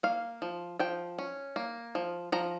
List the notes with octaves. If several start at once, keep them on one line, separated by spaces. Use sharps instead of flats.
A#3 F5
F3
F3 G5
C#4
A#3
F3
F3 A#5